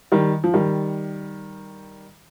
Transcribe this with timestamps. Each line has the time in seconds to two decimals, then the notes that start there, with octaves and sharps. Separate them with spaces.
0.12 D#3 G3
0.44 F3
0.54 D#3 G3